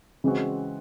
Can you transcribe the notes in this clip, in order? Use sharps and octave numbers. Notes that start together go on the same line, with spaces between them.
C#3 E3 G#3 C4 F#4